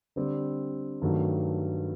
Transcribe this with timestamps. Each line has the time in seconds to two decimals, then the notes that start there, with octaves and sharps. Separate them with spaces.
0.16 D3 G3 C4
1.02 G2 D#3 F#3 A3